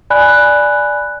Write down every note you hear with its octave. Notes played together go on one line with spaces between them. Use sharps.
D5 G#5 B5 F#6